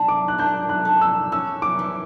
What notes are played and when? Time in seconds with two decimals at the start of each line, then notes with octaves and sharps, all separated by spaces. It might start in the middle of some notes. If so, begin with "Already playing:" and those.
Already playing: D4 A5
0.08 D6
0.28 F#6
0.38 D4 G6
0.69 F#6
0.85 A3
1.01 E6
1.32 C#4 E6
1.62 D6
1.79 E3